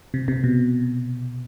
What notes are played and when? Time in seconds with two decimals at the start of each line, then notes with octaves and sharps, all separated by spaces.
0.14 C3
0.28 C3
0.44 B2